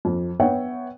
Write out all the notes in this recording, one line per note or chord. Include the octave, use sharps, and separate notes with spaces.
F2
B3 C#5 E5 F#5 G5